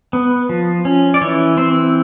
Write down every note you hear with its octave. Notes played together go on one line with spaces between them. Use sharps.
B3
F3
C#4
D5
E3 C#5
C4 C5